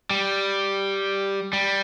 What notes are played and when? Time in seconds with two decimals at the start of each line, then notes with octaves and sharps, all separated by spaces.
0.10 G3
1.53 G3